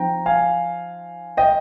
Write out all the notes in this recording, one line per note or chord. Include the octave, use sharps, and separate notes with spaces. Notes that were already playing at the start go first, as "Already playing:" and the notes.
Already playing: F3 C4 D#4 G5 A#5
F5 G#5
D#5 G5